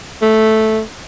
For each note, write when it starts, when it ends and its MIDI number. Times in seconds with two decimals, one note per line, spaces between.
0.22 0.81 57